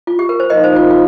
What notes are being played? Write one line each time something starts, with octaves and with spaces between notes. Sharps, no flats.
F4
G4
A#4
C5
A#2 F3 D#4 A#4 D#5
C5
F4
F4